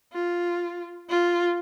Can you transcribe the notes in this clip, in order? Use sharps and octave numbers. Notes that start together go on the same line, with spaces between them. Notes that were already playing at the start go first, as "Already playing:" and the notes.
F4
F4